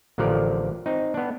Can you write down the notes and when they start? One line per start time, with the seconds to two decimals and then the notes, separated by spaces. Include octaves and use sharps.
0.18 A1 D3 F3 A#4 D5
0.86 C4 D#4
1.14 B3 D4